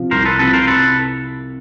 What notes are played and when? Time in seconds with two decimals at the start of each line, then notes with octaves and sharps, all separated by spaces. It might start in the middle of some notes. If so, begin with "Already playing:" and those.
Already playing: C3 F3
0.11 C2 A#4 C5
0.25 A4 B4
0.39 C3 F3 A4 B4
0.53 A#4 C5
0.67 C3 A4 B4